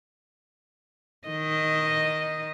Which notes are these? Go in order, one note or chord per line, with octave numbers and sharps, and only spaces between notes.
D#3 D#5